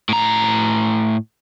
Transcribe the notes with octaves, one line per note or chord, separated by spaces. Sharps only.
A2 A#5